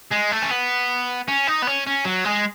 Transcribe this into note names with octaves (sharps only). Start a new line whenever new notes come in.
G#3
A3
C#4
B3
C#4
D#4
B3
C#4
C#4
F#3
G#3